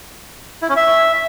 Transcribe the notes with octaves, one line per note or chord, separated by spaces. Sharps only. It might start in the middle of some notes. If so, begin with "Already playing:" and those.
E4
C#4
E5